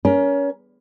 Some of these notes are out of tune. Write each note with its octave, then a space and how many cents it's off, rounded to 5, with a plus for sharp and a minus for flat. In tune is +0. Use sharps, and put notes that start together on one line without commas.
C#4 +25 A#4 +25